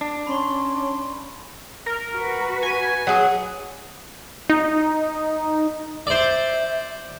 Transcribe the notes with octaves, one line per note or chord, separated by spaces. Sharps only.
D4
C#4 B5 C6 G7
A#4
F#4 B4
G#5
F#3 G#4
D#4
C5 D5 E5